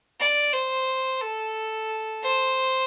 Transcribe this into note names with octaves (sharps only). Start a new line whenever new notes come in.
D5
C5
A4
C5